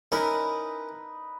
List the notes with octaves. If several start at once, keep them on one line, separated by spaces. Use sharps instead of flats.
C#4 D#4 E4 A#4 B4